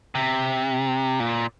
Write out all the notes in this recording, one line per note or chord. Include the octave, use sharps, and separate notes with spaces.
C3
A#2